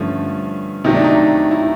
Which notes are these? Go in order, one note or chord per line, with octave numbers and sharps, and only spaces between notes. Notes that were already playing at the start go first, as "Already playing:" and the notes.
Already playing: G2 D3 F3 A3 C#4
C3 D#3 F#3 A3 D#4
D4
D#4
E4